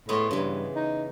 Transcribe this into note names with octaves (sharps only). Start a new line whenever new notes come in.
A2 G#3 B3 G#4
G2 C#3 E3
D#4